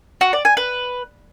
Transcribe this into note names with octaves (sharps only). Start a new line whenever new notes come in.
F#4
D5
G#5
B4